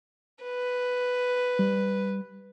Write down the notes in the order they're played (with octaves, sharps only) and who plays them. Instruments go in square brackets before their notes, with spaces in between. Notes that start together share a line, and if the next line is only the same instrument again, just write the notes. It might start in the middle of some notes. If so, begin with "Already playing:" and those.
[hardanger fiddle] B4
[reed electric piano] G3